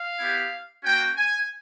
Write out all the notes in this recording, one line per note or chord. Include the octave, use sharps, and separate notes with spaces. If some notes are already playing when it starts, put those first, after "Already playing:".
Already playing: F5
B3 E4 G4
A#3 C#4 F#4 G5
G#5